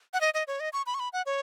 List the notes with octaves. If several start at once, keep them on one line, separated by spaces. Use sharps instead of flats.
F#5
D#5
D#5
C#5
D#5
C#6
B5
C#6
B5
F#5
C#5